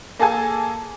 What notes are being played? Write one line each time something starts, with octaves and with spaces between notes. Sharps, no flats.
A#3 G#4 A4 G#5